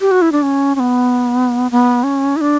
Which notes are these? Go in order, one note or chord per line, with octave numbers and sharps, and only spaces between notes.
G4
F#4
E4
D4
C#4
C#4
B3
B3
C#4
E4
D4